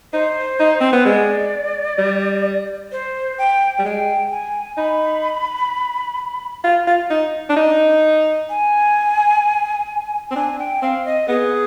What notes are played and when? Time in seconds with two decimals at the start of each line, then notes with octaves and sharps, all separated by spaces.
0.13 D#4 C5
0.60 D#4
0.81 C4
0.93 B3
1.05 G#3 D5
1.98 G3
2.92 C5
3.38 G5
3.79 G3
3.85 G#3 G5
4.31 G#5
4.77 D#4 B5
6.64 F4
6.87 F4
7.11 D#4
7.50 D4
7.56 D#4
8.50 G#5
10.31 C4
10.36 D4 G#5
10.59 G5
10.82 C4 F5
11.05 D#5
11.28 B3 G#4